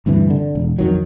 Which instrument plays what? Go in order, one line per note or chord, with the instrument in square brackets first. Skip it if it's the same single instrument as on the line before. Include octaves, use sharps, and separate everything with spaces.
[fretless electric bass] D2 G2 C3 E3
D3
E1
F2 D#3 F#3